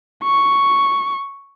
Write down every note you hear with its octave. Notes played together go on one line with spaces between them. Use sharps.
C#6